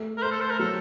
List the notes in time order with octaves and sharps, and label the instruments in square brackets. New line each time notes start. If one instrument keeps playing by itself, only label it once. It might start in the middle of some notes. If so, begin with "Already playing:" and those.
Already playing: [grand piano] A3
[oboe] A#4
[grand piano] A3 [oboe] C5
[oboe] A4
C5
A#4
[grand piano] F#3 [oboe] A4